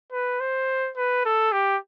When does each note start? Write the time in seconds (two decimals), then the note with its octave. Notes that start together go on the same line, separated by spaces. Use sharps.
0.12 B4
0.40 C5
0.96 B4
1.25 A4
1.52 G4